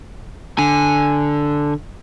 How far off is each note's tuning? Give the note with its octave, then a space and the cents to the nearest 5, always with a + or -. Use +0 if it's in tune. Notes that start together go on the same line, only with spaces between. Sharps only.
D3 +0 G#5 +0